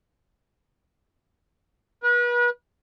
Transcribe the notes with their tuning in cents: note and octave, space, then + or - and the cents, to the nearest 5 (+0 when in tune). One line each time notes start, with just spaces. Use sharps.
B4 -35